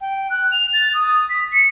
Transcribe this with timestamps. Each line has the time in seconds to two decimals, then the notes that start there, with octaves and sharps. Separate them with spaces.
0.01 G5
0.30 F#6
0.51 F7
0.73 A6
0.94 D#6
1.29 B6
1.52 C#7